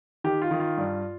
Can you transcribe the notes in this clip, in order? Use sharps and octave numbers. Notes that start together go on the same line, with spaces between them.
D#3 G4
F4
D#3
F4
G2